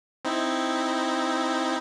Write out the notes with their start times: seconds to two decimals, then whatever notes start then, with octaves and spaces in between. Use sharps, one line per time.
0.25 C4 D#4 E4